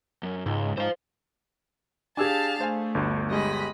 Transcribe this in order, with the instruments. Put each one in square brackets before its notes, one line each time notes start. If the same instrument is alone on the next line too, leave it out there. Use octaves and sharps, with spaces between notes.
[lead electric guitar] F#2
[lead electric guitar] C#2 [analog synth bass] G#2
[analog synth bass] G#2 [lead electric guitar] C5 F5
[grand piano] D4 G#4 [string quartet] G4 F5 A5 [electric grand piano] G#5 E6 G#6
[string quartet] A3 [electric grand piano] C5 F5 G#5
[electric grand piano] G1 D2
[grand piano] G3 G#3 [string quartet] D#5 B5